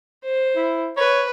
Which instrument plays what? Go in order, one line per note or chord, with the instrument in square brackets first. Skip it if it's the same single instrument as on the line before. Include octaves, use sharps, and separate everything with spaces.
[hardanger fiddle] C5
[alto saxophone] E4
[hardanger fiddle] B4 [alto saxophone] C#5